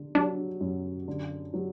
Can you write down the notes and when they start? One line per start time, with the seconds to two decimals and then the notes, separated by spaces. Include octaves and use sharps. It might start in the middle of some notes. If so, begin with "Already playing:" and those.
Already playing: D3
0.15 F#3 D4
0.61 F#2
1.08 D3
1.54 F#3